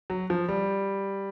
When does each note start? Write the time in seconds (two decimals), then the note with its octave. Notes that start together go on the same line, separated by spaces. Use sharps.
0.10 F#3
0.30 F3
0.49 G3